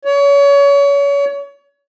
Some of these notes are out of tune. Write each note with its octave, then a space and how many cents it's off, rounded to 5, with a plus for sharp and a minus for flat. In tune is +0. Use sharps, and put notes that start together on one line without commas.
C#5 +30